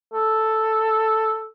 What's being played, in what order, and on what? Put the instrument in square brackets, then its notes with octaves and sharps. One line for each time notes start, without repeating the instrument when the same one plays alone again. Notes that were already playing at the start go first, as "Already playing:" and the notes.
[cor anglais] A4